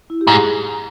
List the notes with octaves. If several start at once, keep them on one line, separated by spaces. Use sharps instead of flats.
E4
G4
G#2
G#4